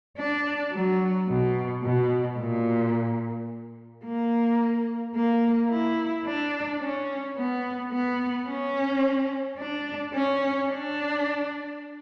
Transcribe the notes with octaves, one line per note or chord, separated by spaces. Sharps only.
D4
F#3
B2
B2
A#2
A#3
A#3
E4
D4
C#4
B3
B3
C#4
D4
C#4
D4